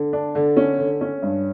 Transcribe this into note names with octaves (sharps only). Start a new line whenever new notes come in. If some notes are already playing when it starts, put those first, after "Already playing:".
Already playing: D3
D4
D3
C#4
D3
C#4
G2